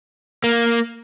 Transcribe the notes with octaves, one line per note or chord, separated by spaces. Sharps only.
A#3